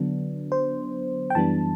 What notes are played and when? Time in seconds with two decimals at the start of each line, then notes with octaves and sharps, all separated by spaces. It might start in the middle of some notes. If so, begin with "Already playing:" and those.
Already playing: D3 F#3 B3 D4
0.52 C5
1.30 G5
1.35 F#2 E3 G3 B3 D4 A5